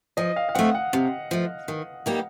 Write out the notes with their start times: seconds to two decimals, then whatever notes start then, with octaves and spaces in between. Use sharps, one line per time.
0.17 F3 D#5
0.36 F5
0.49 F5
0.55 A3 C4 F#5
0.75 F#5
0.93 C3
1.31 F3 A3
1.68 D#3
2.06 G3 A#3 D#4 G4